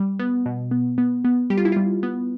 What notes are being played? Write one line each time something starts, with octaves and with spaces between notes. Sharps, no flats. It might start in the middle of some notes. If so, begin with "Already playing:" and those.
Already playing: G3
B3
B2
B3
B3
B3
G3 G4
F4
E4
G3 F4
B3